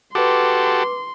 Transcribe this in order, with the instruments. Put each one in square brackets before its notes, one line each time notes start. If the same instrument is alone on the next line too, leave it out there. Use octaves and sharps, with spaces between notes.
[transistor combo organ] F#4 G4 A4 [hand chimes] B4 D6 [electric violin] C6